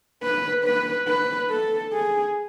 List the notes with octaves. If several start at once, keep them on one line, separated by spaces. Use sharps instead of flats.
B4
B4
B4
A4
G#4